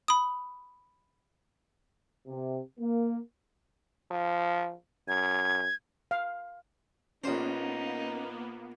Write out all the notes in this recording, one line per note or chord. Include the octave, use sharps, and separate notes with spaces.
B5 D#6
C3
A#3
F3
F#2 G#6
F5
A#1 A#3 B3 C#4 D#4 C5